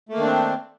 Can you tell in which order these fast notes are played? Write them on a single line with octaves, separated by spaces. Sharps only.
A3 A#3 D#3 D4 C4